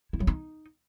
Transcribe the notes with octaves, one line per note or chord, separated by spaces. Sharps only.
E4
F#3
D#4